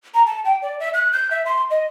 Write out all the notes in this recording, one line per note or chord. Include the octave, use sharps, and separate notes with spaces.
A#5
A5
G5
D5
E5
F#6
G6
E5
C6
D#5